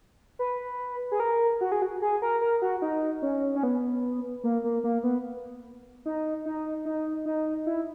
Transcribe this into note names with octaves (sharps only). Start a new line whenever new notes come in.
B4
G#4
A#4
F#4
G#4
F#4
G#4
A#4
A#4
F#4
D#4
C#4
C#4
B3
A#3
A#3
A#3
B3
D#4
D#4
D#4
D#4
E4